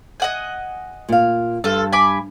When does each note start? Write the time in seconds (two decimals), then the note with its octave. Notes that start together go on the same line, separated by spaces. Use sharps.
0.20 D#5 F#5 G#5
1.09 A#2 F5
1.64 G2 F4 A4
1.93 G#5 B5 D6